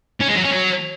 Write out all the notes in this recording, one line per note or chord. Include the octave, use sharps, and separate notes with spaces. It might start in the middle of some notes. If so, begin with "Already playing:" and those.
C#4
G#3
F#3
C#4
F#3